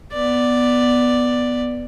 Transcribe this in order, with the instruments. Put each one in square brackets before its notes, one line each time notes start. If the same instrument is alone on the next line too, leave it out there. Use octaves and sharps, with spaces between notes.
[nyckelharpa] B3 D5